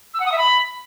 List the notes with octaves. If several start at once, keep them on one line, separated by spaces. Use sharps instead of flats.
E6
F#5
D#6
E5
B5